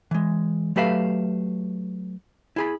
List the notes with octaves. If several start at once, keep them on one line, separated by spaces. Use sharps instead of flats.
E3 G#3
F#3 A3 G4 B4 E5 F5
E4 G#4 B5